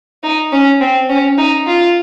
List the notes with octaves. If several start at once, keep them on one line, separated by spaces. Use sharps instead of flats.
D#4
C#4
C4
C#4
D#4
F4